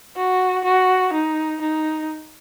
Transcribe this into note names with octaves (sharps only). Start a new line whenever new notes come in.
F#4
F#4
D#4
D#4